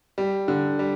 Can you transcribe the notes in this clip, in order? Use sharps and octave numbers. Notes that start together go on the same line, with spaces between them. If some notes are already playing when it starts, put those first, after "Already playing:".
G3
D3
G3